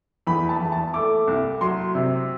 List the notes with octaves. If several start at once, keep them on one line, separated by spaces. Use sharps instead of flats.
E2 B5
A5
E2
A5
A3 D6
C2
F#3 C6
C3